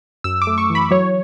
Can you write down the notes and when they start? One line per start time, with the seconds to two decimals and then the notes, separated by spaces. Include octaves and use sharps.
0.24 F#2 E6
0.42 D6
0.47 A3
0.58 C#6
0.70 E3
0.75 B5
0.91 F#3 C#5